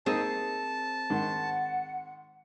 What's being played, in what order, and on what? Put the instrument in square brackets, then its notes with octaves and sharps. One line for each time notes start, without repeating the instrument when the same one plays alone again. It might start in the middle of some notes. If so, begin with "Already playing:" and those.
[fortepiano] A#3 D#4 [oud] C4 G#4 [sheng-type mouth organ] A5
[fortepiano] G#2 D#3 [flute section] F#5